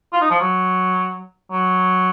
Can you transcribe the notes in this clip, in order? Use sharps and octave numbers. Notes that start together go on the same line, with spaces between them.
F4
D#4
F3
F#3
F#3